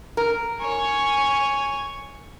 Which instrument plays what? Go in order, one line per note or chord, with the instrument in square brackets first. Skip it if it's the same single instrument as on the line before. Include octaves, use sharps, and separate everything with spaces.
[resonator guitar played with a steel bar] A#4
[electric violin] C#5 G#5